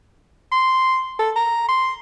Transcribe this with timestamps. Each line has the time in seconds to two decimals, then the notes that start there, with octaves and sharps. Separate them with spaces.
0.52 C6
1.19 A4
1.36 A#5
1.69 C6